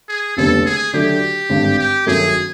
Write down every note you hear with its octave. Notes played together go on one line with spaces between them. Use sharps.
G#4
F1 D#2 D3 G3 B3 A4
G#4
D3 F#3 A3 G4
G#1 G2 D3
G4
G1 F#2 D#3 F#3 A3 G#4